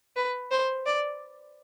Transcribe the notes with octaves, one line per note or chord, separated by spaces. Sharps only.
B4
C5
D5